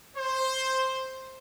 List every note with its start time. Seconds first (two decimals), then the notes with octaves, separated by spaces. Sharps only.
0.16 C5